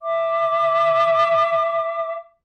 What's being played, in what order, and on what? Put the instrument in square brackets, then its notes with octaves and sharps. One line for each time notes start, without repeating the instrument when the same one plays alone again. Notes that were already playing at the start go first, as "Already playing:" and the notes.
[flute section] E5 D6